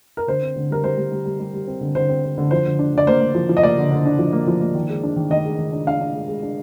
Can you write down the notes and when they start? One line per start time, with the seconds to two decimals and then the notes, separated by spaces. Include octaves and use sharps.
0.17 A#4
0.27 D3 C5
0.42 C4
0.56 D3
0.70 G3 A#4
0.83 G3 C5
0.97 G3
1.12 G3
1.25 G3
1.39 G3
1.54 G3
1.67 C4
1.81 D3
1.95 D3 C5
2.09 C4
2.23 C4
2.38 D3
2.51 F3 C5
2.66 D3
2.79 D4
2.93 D3 D5
3.07 A#3 C5
3.21 A#3
3.35 F3
3.49 F3
3.57 D#5
3.63 A#3 D5
3.78 D3
3.92 D3
4.06 D4
4.19 F3
4.33 A#3
4.48 F3
4.61 A#3
4.75 D#3
4.89 G#3
5.03 D4
5.16 D#3
5.30 D#3 D#5
5.45 G#3
5.59 D#3
5.72 D4
5.87 D4 F5
6.01 D4
6.15 G#3
6.28 G#3
6.43 D4